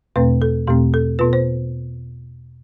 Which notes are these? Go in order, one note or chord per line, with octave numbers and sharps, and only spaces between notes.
E2 B2 A3 C4 B4
A4
E2 B2 A3 C4 G4
A4
B2 B3 F4 B4
C5